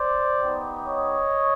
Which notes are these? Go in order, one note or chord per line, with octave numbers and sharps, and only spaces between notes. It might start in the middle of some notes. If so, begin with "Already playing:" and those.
Already playing: C5 D5
B3 D#4 G4
C#5 D#5